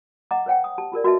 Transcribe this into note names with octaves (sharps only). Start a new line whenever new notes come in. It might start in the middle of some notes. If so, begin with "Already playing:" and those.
D#5 F#5 A#5 D6
B4 C#5 F#5 G5
D#6
G4 A5
F4 G4 A#4 D5
F#4 B4 D#5 E5 A5